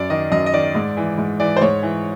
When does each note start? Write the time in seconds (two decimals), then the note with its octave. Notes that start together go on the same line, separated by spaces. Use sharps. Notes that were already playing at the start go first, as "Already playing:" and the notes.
Already playing: F#2 D5
0.10 D#3 D#5
0.32 F#2 D#5
0.46 D#5
0.53 D#3 D5
0.75 G#2
0.97 E3
1.18 G#2
1.40 E3 D5
1.56 C5
1.61 G#2 C#5
1.83 E3